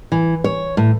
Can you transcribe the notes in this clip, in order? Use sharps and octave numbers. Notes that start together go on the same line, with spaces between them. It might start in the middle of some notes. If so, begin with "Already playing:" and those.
E3
C#5
A2